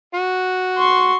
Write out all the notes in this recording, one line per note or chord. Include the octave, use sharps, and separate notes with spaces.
F#4
C6 C#6